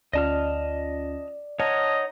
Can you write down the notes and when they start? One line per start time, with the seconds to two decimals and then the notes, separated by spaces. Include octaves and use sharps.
0.13 D2 C#4 F4 D5 D#5 A5 F6
1.60 D#4 C#5 D#5 F#5 A5 F6 G#6